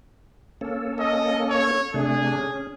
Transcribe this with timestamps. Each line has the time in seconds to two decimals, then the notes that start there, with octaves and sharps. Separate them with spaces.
0.61 A#3 C#4 A4
1.00 D#5
1.50 C#5
1.94 C3 A3 D4 G#4
2.37 C#4